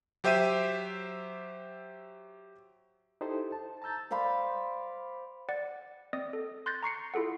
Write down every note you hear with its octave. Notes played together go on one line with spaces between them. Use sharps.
F#3 G4 C5 E5 G5 D#7
D#4 E4 G4 A4 C5 D#5
A5
A5 A#5 E6 G6 A6
C5 D5 F5 B5
D5 F#5 A6
C4 D5 D#5 D#6
A4
C6 F#6 G6 A6 A#6
A#5 C#6 C7 C#7
E4 F4 G#4 A4 F#5